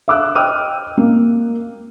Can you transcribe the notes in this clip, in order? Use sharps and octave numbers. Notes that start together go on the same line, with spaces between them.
E5 F5 D6 E6 F#6
D#5 G5 D6 E6 F6 D#7
A#3